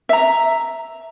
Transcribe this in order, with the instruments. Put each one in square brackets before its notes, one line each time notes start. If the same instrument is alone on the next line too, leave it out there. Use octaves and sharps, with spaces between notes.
[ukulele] E5 A#5